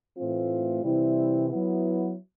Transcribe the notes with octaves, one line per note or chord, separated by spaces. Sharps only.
A2 E3 A3 C4 F4
C3 E3 G3 C4 E4
F#3 B3 E4